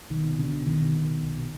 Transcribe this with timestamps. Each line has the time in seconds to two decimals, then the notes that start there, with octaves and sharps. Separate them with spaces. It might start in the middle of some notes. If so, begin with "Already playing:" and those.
0.10 B1 D#3
0.24 B2
0.38 B2 D3
0.53 B1
0.66 B1 D#3
0.81 B2
0.95 B2
1.09 B1
1.23 B1
1.37 B2